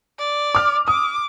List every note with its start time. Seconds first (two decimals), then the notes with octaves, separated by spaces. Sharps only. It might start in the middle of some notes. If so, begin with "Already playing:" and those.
0.19 D5
0.55 D6 F6
0.88 D6 D#6